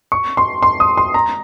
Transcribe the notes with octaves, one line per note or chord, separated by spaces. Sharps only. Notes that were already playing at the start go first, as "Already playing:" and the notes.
C#6
C6
C6
D#6
C6
A#5